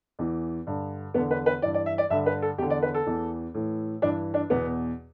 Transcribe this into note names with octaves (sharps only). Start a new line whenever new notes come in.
E2 E3
G2 D3
E2 D3 B3
B4
B4
G2 E3 D5
D5
E5
D5
G2 D3 E5
B4
A4
E2 D3 G4
D5
B4
A4
E2 E3
A2 E3
G2 E3 D4
D4
E2 B2 B3